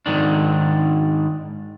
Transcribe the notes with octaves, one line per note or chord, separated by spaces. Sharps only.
G#2 D#3 D4